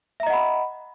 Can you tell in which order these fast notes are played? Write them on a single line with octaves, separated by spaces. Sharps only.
E5 A#5 D#5 F#5 B5